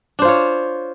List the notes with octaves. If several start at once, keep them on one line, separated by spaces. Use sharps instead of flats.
D4 F4 C5 C#5